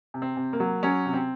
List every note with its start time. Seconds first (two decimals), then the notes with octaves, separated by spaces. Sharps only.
0.14 C3
0.22 C4
0.37 C3
0.53 A#3
0.60 F#3
0.83 F#3 C#4
1.05 C3
1.13 C4